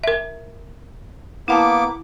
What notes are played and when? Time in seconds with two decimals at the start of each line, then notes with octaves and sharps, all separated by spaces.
0.04 A#4 E5
1.48 A#3 B3 E4 F#5 A5 D6